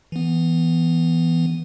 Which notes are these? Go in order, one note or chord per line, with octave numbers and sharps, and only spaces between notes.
E3 B3